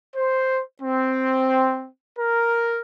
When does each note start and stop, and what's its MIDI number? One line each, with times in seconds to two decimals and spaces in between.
0.16 0.60 72
0.81 1.86 60
2.18 2.80 70